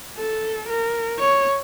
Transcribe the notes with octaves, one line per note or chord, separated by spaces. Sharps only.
A4
A#4
C#5